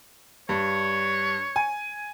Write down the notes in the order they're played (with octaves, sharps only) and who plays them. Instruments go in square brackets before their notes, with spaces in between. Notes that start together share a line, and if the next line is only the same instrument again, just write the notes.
[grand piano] G2 [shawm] C#5
[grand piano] G#5